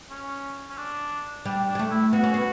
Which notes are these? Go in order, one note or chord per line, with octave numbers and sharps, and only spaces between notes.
C#4
C#4
D4
G3 D4
D4
G3
A3
E4
B3 F#4
C#4
B3